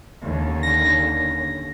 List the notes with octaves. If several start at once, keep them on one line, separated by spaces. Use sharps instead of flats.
D#2 D3 C#4
A#6